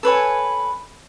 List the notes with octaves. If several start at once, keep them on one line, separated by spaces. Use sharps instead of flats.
A4 B4 C#5 G#5